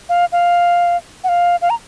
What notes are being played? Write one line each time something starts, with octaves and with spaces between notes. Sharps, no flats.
F5
F5
F#5
F5
F5
A#5